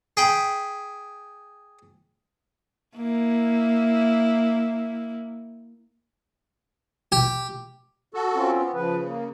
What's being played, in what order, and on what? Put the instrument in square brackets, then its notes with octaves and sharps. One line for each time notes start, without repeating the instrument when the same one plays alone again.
[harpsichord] G#4 G5 B5
[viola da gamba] A#3 E4
[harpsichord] G4
[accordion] F#4 A4
[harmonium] C4 C#4 F4
[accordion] B3
[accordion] C#3 [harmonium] F3 B4
[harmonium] A#3